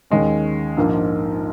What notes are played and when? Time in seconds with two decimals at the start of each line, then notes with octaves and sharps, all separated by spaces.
0.10 D#2 D#3 G#3 C#4
0.77 A#1 G#2 F3 A#3 D#4